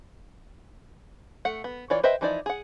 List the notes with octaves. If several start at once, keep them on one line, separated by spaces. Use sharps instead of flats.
A3 F#5
B3
E3 F4 C#5 D5
B4 C5 D#5 E5 G5
E3 F3 D#4 E4 D5
G#4 F#5